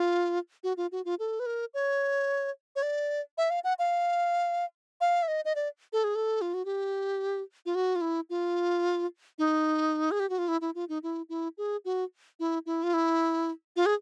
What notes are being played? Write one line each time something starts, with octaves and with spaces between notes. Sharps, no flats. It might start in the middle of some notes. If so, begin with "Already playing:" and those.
Already playing: F4
F#4
F4
F#4
F4
A4
B4
A#4
C#5
C#5
D5
E5
F5
F#5
F5
F5
E5
D#5
D#5
D5
A4
G#4
A4
F4
F#4
G4
F4
F#4
F4
E4
F4
D#4
G#4
G4
F#4
F4
E4
E4
F4
D#4
E4
E4
G#4
F#4
E4
E4
F4
E4
F4
G#4